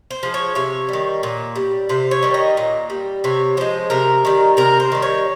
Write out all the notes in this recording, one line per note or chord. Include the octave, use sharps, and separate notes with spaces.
C5
F3 G#3
C#5
C3 C#5
D#3 G3
A#2
G3
C3 C5
C#5
D#3 G3
D#5
A#2
G3
C3 C#5
F3 G#3 C5
C3 A#4
D#3 G3
C3 A#4
C5
D#3 G3
C#5